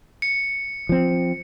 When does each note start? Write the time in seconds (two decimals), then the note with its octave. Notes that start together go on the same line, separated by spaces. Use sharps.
0.22 C#7
0.89 F3 C4